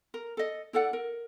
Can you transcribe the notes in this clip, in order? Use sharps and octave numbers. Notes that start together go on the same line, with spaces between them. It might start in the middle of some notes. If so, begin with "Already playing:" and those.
A#4
A4 D#5
E4 A4 D5 F#5
A#4